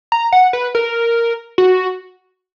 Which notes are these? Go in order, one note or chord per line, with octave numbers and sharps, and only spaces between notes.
A#5
F#5
B4
A#4
F#4